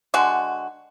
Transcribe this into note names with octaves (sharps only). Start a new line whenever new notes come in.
D3 G#3 F#4